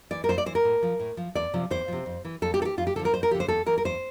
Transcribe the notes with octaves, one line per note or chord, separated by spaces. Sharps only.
E3 D5
A#4
F2 C5
D5
E3 C5
A#4
A2
F3
A2
F3
E2 D5
C3 F3
E2 C5
C3 F3
F2
E3
F2 A4
G4
E3 A4
G4
F2 F4
G4
D3 F3 A4
A#4
F2 C5
A#4
D3 F3 G4
C5
E2 A4
E3 A#4
A#4
E2 C5